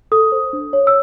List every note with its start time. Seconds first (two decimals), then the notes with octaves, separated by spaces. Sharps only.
0.12 A4 D#6
0.32 C5
0.53 D4
0.73 C#5
0.87 E6